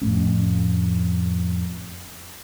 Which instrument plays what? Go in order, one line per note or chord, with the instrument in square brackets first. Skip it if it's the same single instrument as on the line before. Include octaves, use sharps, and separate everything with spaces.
[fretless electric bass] F2 A2 A3 C#4